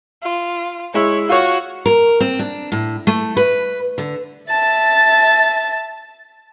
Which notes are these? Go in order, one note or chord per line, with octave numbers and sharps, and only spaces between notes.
F4
G#3 E4 C#5
F4 F#4 C#5
A#4
C4
D4
A2
A3
B4
D3
E5 A5 A6